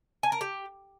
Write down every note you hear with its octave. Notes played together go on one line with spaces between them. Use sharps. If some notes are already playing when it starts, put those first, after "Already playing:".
G#5
A#4
G4